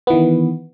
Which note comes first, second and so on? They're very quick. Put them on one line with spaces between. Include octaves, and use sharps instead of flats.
B3 E3 D#3